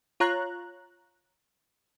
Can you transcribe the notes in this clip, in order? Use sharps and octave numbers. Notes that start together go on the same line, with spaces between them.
F4 C#5 A#5 F#6